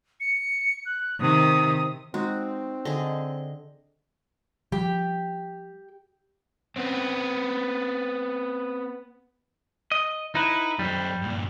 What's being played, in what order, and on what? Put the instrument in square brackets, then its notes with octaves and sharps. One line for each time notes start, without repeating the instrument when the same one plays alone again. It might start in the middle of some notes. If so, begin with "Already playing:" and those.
[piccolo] C#7
F#6
[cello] C3 D#3 [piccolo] D#6
[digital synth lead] G#3 [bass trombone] C4 [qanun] D#4 F#4
[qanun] D3 G#4 [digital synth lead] D#5
[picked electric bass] F3 G3 [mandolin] G4
[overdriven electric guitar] B3 C4
[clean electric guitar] D#5
[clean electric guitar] D#4 B4 [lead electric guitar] E4
[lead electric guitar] F#2 C5 [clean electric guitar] G3
[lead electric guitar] G2 A#2